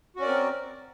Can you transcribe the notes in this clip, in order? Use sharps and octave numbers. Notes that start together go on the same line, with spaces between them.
C4 C#4 F#4 A#4 D5